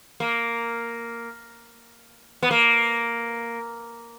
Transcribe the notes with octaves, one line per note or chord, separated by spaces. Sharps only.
A#3
B3
A#3